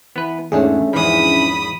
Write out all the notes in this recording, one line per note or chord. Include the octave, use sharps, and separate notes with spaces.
E3 B3 B4
E2 G#2 A3 C#4 D4 G#4
E2 G#2 E3 F3 B5 D#6